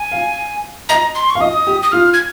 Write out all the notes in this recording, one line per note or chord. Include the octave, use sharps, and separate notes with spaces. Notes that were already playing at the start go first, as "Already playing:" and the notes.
Already playing: G#5
F5
D#5 A#5
C6
C#6
F5
D#5 D#6
G4
D#6
F4 F6
G#6